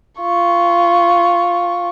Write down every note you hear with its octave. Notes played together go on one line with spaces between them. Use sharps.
F4 C#6